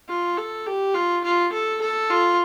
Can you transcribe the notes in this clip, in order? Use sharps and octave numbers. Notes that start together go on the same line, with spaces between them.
F4
A4
G4
F4
F4
A4
A4
F4